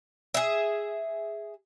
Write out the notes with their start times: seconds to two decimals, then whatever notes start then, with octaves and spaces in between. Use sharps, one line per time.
0.34 G#4 E5